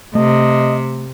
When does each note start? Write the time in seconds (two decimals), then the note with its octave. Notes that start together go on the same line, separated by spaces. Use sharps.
0.15 C3 A3 D#5